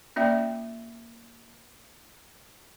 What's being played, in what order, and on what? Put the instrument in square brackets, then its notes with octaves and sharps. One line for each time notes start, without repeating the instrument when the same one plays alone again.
[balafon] A#3 C#4 F4 D5 E5 G5